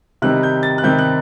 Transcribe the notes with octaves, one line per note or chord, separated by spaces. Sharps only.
C3 D#3 G3 C4 D#4 F#6
G6
A6
F#6
C3 D#3 G3 C4 D#4 G6
F#6